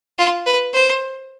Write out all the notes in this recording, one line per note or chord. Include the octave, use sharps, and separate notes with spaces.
F4
B4
C5